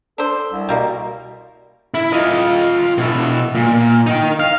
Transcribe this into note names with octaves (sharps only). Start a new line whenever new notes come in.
D4 A4 C5
C2
B2 G3 A#3 E4
E4
F4 D#5
B2 E4
A#2
D#4 G5
F5